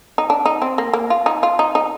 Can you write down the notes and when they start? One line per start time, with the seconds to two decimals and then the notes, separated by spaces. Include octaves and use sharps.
0.18 D#4
0.30 D4
0.46 D#4
0.62 C4
0.78 A#3
0.93 A#3
1.10 F4
1.26 D#4
1.43 F4
1.59 D#4
1.75 D#4